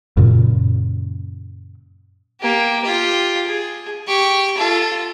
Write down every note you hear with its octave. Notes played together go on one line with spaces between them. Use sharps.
F#2 A#2 C#3
A#3 G4
F4 G4
G#4
G4 C#6
F4 A4